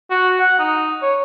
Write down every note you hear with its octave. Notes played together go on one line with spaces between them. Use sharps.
F#4
F#5
D#4
C#5